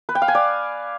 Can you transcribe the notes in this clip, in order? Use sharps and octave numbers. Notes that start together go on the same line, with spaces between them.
B4
G5
F5
G#5
D5